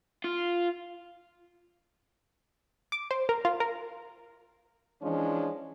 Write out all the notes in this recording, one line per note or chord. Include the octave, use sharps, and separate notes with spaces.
F4
D6
C5
A#4
F4
A#4
E3 F3 G#3 C#4 D4